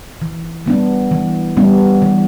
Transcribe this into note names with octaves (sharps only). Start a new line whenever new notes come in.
E3
G3 B3 D4
E3
G3 B3 D4
E3